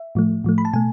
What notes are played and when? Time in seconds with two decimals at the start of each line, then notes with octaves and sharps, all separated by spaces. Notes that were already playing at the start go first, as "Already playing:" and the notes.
Already playing: E5
0.15 A2 F3 A3
0.44 A2 F3 A3
0.58 B5
0.65 A5
0.74 B2 A3 G#5